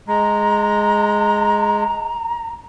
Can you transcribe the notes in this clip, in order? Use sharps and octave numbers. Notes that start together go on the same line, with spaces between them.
G#3 A#5